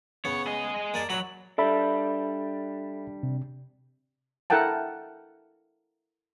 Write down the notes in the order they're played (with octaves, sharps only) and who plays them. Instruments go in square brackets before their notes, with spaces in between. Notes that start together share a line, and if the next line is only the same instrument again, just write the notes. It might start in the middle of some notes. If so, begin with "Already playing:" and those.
[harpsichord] C#3 B3 [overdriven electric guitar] C#5
[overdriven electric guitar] G#4 D#5
[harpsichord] A#3 D5 A5
[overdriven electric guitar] F#3 [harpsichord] C#5 F#5 B5
[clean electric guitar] G3 D4 [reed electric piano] A4 E5 B5
[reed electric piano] C3
[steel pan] E4 A4 A#4 F#5 G5 A5